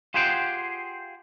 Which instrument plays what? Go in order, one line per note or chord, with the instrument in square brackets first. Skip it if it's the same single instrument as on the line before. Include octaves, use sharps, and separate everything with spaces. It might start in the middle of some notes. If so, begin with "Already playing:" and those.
[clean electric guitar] F4 G4 G#4 C5 F#5 G5